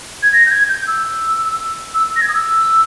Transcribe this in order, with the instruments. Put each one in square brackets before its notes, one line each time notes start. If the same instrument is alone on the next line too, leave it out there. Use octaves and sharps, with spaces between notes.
[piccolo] G#6
A#6
G6
G#6
G6
E6
E6
A#6
G#6
D#6
E6